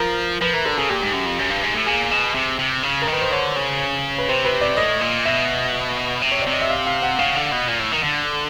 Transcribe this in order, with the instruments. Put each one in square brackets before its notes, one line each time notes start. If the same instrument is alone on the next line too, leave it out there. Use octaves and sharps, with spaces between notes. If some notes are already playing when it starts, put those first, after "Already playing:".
Already playing: [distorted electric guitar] F3 [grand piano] A#4
[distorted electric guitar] F3 [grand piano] B4
[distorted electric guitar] E3 [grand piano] A#4
[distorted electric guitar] D3 [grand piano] A4
[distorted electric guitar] C#3 [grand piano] G#4
[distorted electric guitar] A#2 [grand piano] G4
[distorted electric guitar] G#2
F#2
F2
F#2
G2
G#2
A2
[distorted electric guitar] A#2 [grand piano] G#4
[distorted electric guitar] B2
C3
C3
C#3
[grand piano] A#4
[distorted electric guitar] D#3 [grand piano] B4
[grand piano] C5
[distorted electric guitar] D3 [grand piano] C#5
[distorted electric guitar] C#3
[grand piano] B4
[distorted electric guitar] C3 [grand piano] C5
[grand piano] B4
D5
[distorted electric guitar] A2 [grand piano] D#5
[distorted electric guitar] A#2
[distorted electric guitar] B2 [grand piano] E5
[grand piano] E5
[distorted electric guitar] C3
[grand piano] C#5
D5
[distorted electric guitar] C3 [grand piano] D#5
[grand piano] E5
F5
F5
F#5
[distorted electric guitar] C#3 [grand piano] F5
[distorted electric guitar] D3
B2
A#2
A2
D#3
D3